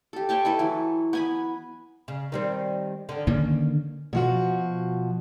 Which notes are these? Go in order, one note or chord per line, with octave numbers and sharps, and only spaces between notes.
G4 A4
C5 C#5 G5 A5
E4 A4 B4
E3 F#3
B3 G#5 B5
C#3
D#3 G3 C4
D3 D#3
D3 D#3 A#3 C#4
B2 F3 F#4